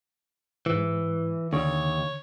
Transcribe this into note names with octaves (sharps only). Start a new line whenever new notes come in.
G#2 E3
D#2 D3 C#5